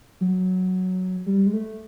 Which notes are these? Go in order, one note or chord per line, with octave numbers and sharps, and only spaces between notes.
F#3
G3
G#3
A3